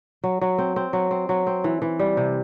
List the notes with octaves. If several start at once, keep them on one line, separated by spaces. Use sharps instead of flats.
F#3
F#3
C4
C4
F#3
C4
F#3
C4
E3
E3
G3
C3